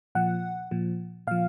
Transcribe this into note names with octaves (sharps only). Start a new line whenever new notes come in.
A#2 F3 F#5
A#2 F3
A#2 F3 F5